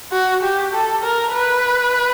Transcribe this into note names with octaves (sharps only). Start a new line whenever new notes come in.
F#4
G4
A4
A#4
B4